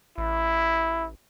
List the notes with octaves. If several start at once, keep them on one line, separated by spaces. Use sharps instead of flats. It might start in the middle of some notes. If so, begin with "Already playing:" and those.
A1 E4